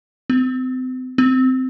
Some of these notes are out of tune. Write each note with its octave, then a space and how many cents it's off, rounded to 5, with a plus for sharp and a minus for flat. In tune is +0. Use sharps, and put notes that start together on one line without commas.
C4 -35
C4 -20